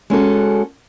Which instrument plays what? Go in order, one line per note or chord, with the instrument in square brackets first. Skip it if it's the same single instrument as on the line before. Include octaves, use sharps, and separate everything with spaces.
[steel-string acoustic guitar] G#3 C#4 F#4 A4